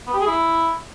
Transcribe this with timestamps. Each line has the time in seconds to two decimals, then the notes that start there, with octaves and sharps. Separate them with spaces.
0.07 B3
0.14 G4
0.20 G#4
0.27 E4